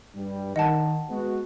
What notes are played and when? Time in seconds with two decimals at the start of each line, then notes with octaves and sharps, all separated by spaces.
0.15 G2 G3
0.56 D#3 D#5 F#5 A5
1.09 G#3 B3 F#4